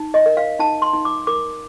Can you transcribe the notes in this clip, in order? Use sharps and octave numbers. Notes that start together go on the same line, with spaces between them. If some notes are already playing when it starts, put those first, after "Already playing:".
Already playing: D#4
D#5
A#4
F5
D#4 A5
C6
D#4
D6
A#4 D6